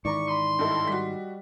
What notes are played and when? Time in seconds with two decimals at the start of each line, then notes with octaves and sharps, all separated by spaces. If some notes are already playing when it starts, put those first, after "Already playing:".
0.05 G#2 D#3 E3 D5 A#5 B5 C#6
0.28 B5 C6 D#6
0.59 G2 E4 A4 D#5 G5
0.87 G3 F#4 B6